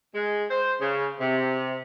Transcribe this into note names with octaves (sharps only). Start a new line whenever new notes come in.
G#3
C5
C#3
C3